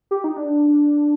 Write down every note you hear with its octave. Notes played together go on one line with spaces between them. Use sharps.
G4
D#4
D4